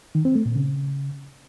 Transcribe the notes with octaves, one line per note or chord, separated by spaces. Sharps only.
D#3
C4
A3
A#2
C#3